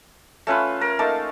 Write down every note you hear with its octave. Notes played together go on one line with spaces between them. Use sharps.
A3 C#4 F4 B4
A#4
A3 A#3 D#4 A5